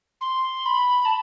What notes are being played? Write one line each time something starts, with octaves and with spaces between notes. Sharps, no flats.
C6
B5
A5